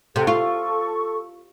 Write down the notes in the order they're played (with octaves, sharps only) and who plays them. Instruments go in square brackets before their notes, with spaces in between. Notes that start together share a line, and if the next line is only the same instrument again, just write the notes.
[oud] C3 [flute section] A4 F#5 G5
[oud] F4 [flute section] A4 C#6